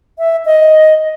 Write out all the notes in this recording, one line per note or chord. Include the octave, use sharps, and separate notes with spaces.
E5
D#5